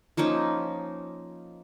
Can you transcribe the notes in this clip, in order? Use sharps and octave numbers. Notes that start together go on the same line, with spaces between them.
F3 A#3 C#4 D#4